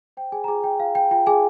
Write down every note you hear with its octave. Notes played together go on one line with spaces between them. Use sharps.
C5 G5
G#4 G#5
A#5
F4 G#4 G#5
G5
F4 F5
G5
F4 G5
G#4 G#5